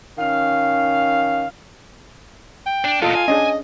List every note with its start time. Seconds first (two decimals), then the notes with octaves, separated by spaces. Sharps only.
0.18 D#3 C#4 F5
2.66 G5
2.84 D4
3.02 E2 A#2 F4 A4 D#5
3.15 F5 G#5
3.28 C#4 D4 G#4 D#5